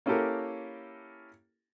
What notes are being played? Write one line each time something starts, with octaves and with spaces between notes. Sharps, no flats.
A#3 C#4 E4 G4 A4 A#4